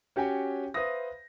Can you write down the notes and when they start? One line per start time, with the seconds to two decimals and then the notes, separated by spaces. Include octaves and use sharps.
0.16 C#4 F#4 G4 C#5 G5 G#5
0.74 B4 C5 E5 F5 D#6 A#6